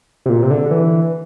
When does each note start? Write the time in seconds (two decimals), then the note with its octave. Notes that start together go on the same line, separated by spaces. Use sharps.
0.26 C3
0.29 A#2
0.43 C3
0.51 D3
0.71 E3